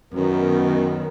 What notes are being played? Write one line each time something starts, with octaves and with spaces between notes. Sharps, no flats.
F#2 D#3 B3